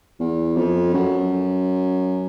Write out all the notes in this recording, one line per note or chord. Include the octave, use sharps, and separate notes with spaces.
E2
F2
F#2